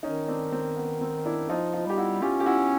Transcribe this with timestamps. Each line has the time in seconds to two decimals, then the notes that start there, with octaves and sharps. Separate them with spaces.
0.03 D#3 C#4 D#4
0.28 C4 D4
0.52 C4
0.76 B3
1.01 C4
1.25 D4 E4
1.49 F3 D#4 F4
1.73 D#4 F4
1.86 G3 G4
1.97 E4 F#4
2.22 C#4 F4 G4
2.40 G4
2.46 E4 F#4